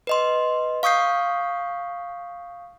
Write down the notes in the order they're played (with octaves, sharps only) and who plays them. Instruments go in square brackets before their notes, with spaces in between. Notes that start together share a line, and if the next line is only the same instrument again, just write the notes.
[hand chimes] B4 D#5 C6
F5 C#6 D#6 G6 C7